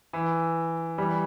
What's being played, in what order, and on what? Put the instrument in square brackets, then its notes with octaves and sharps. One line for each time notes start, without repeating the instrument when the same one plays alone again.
[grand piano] E3
E3 G3